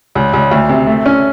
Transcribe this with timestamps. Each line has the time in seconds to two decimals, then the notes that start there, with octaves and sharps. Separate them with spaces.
0.15 C#2
0.33 C#2
0.51 D2
0.69 C3
0.87 A3
1.06 C#4